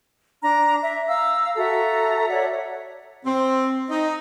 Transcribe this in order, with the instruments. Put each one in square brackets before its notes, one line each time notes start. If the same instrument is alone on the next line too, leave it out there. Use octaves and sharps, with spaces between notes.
[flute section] D4 A#5
E5
F5 A#5 E6
F#4 A4 E5 A#5
C#5 D5 E5 F#5
[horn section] C4
D#4